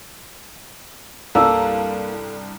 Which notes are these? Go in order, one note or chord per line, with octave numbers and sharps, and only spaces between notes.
C2 G2 A#3 D4 A4 A5 E6